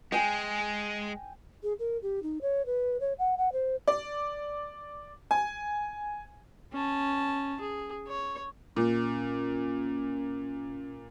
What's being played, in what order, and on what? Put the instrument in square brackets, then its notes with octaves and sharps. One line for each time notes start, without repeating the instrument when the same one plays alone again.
[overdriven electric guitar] G#3 [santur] G5 G#5
[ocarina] G#4
A#4
G4
D#4
C#5
B4
C#5
F#5
F#5
C5
[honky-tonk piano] D5
G#5
[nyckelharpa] C#4 A5
G#4
C#5
[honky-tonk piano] A#2 [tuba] C#4